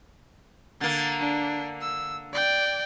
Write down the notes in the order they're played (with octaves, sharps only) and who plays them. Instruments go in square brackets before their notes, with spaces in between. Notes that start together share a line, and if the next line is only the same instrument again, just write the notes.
[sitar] D3 A#3 [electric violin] A6
[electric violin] D4
E6
D5 G5